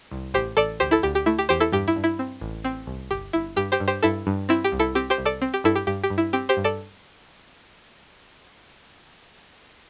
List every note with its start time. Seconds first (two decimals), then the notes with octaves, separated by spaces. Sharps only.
0.11 C2
0.34 A1 G4 C5
0.57 A1 A4 D5
0.80 D2 G4 C5
0.91 E4 A4
1.03 D2 G4
1.15 G4
1.26 A3 E4
1.39 G4
1.49 E2 G4 C5
1.60 E4 A4
1.72 G2 G4
1.88 E4
1.96 G2
2.04 E4
2.19 C4
2.41 A1
2.64 C4
2.87 C2
3.11 G1 G4
3.33 G1 E4
3.56 G2 G4
3.72 G4 C5
3.80 G2
3.88 G4 C5
4.03 G2 E4 A4
4.27 G2
4.49 C4 E4
4.64 G4
4.72 C2
4.79 E4 A4
4.95 C4 G4
5.10 G4 C5
5.18 C2
5.26 A4 D5
5.42 C4
5.54 G4
5.64 G2 E4 A4
5.75 G4
5.87 G2 G4
6.04 G4
6.10 G2
6.18 E4
6.33 C4 G4
6.49 G4 C5
6.57 G2
6.64 A4 D5